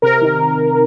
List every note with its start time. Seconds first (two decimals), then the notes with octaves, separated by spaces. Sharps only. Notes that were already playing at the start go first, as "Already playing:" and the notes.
0.02 C3 A#4
0.21 D#3